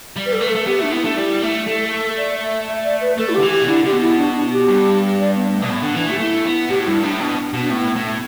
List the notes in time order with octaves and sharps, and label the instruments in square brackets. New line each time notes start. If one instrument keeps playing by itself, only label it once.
[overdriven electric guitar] G3
[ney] B4
A4
[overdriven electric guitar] A3 [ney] B4
[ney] A4
[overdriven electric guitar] A3
[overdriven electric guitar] B3 [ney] G4
[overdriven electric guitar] A3 [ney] D4
[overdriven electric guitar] B3 [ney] E4
[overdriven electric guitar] A3 [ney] D4
[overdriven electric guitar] G3 [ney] E4
[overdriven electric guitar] A3
[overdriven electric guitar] A3 [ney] A4
[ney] A4
D5
E5
E5
D5
B4
[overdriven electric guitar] A3 [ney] A4
[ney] E4
[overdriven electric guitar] D3 [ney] G4
[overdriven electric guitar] E3
[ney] G4
[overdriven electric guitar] B2
[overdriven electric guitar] D3 [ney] E4
[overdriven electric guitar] D3 [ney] G4
[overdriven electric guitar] B2
[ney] E4
D4
D4
G4
[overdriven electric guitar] G2
[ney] D5
B3
A3
[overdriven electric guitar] B2
[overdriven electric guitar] A2 [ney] B3
[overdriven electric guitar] D3
[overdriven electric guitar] E3 [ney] D4
[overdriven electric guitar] A3
[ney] G4
[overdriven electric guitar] A3 [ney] E4
[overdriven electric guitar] B3
[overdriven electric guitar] A2 [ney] G4
[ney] G4
[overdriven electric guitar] G2 [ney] E4
[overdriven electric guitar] A2 [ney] D4
[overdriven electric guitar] B2 [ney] D4
[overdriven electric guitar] B2
[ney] D4
[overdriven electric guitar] A2 [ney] B3
[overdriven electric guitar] A2 [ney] A3